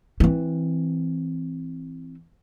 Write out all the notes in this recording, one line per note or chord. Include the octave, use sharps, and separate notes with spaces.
E3 C4